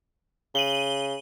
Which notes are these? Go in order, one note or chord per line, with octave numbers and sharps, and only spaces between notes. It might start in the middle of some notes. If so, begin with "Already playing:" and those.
C#3 D#7 F#7 G7